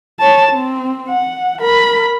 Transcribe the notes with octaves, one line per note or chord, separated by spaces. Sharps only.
C#5 A5
C4
F#5
A#4 B5